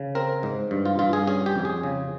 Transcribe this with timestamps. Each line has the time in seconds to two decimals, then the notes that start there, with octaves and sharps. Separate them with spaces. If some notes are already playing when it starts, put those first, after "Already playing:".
Already playing: C#3
0.15 C4 A#4
0.43 G#2
0.71 G2
0.85 F4
0.99 G2 F4
1.13 G#4
1.27 C#4 G#4
1.46 G4
1.56 F2
1.65 G#4
1.83 C#3